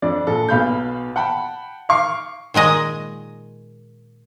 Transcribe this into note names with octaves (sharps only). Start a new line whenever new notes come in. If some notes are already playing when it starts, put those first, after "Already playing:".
F2 D4 D5
A#1 A4
B1 B2 F5 B5 G6
F#5 G5 A5 B5
F5 C#6 D6 C7
A#2 D#3 G#3 D#5